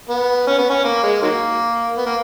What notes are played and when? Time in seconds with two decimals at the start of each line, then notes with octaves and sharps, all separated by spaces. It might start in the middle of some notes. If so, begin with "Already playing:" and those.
0.09 B3
0.47 C#4
0.58 B3
0.70 C#4
0.84 A#3
1.03 G#3
1.22 D#3 F#3 A#3
1.97 B3
2.06 A#3